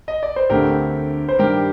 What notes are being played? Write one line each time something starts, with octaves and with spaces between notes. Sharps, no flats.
D#5
D5
C5
D2 D3 A3 C4 G4 A#4
C5
G2 D#3 G3 G4 A#4